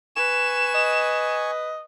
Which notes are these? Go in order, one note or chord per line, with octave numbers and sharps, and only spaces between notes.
B4 G#5 C#6 E7
D#5